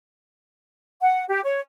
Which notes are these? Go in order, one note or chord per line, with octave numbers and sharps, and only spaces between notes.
F#5
G4
C#5